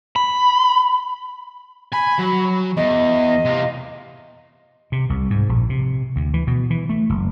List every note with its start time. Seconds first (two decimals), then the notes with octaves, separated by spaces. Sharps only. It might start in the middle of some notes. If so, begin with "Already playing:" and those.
0.16 B5
1.93 G#5 B5
2.19 F#3
2.77 E2 D#5
3.45 C3 F4
4.92 C3
5.09 C2
5.30 G#2
5.49 A#1
5.70 C3
6.16 D2
6.34 E3
6.47 B2
6.70 E3
6.89 A3
7.09 F#1